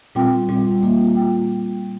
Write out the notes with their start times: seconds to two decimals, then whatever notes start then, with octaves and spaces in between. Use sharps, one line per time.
0.15 A#2 G3 C4 F4 G5
0.49 A#2 G3 C4 F4
0.82 A#2 A#3 F4
1.16 A#2 A#3 F4 G5